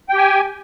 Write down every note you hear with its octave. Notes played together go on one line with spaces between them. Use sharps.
G4 G5 G#5